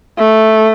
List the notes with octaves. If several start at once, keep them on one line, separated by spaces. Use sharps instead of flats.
A3